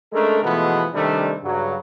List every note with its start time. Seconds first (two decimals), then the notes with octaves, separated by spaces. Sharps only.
0.13 G#3 A3 C#4 D4 A4 A#4
0.42 B2 E3 F3 G#3 A3 B3
0.93 C3 D#3 G3 A3 D4
1.44 G2 C#3 F#3